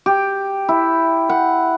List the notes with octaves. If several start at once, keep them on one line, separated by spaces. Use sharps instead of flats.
G4
E4
F#5